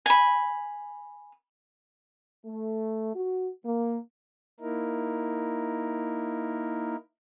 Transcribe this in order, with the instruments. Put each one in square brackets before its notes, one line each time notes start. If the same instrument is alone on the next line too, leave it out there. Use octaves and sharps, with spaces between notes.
[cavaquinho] G#5 B5
[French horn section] A3
F#4
A#3
[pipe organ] A#3 D#4 E4 A#4